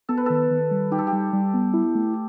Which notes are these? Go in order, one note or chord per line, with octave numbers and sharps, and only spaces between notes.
B3 A4
B4
D#3 A4
D#3
G3
D#4 G4
A4
G4
G3
G3
B3
E4
A3